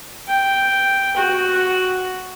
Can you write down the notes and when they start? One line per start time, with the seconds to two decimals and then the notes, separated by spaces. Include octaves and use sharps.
0.28 G5
1.17 F#4